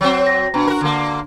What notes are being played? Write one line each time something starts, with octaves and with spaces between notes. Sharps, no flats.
F#3 C4
A#6
B2 D4 A#5
F#4 A#4
D3 A#3